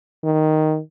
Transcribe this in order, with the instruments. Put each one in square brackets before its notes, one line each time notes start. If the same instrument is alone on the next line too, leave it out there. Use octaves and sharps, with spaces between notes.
[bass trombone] D#3